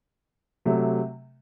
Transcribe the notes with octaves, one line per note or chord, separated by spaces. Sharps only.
C3 F#3 A3